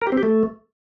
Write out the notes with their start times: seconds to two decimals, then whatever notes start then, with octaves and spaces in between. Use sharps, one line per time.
0.02 A#4
0.07 G4
0.12 C4
0.18 G4
0.23 A3